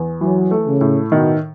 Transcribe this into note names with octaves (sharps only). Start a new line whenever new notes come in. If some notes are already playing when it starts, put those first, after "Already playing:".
Already playing: E2
E3 F#3
A3
C#3
A2
B2 D#3